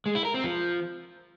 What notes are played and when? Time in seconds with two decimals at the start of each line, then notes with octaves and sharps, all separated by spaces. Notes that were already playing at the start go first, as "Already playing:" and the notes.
0.06 G#3
0.15 E4
0.25 A#4
0.34 C4
0.44 F3